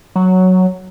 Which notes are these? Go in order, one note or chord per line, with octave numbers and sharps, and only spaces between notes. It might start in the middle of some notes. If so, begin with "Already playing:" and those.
F#3